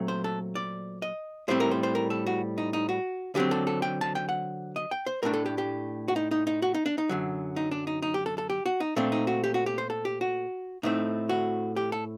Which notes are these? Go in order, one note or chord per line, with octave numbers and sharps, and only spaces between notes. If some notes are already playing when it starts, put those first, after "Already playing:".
Already playing: A#2 F#3 A3 C4
C5
A4
D5
D#5
A2 G3 C4 C5
A#4
C5
C5
A#4
A4
F#4
D#4
D#4
F#4
D3 F#3 C4 G4
A4
A4
G5
A5
G5
F#5
D#5
G5
C5
A2 A3 D4 A#4
A4
G4
G4
F#4
D#4
D#4
D#4
F#4
D#4
D4
D#4
F#2 D3 F#3
D#4
D4
D#4
D#4
G4
A4
A4
G4
F#4
D#4
A#2 A3 C4 D4
D#4
F#4
G4
F#4
G4
C5
A4
G4
F#4
A2 A3 C4 D#4
F#4
G4
A4